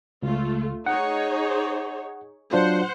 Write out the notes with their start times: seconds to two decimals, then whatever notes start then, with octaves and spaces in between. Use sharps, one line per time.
0.23 C#2 A3 F4
0.86 D#4 G#4 C#5 F#5
2.53 F#3 D4 F4 C5 F#5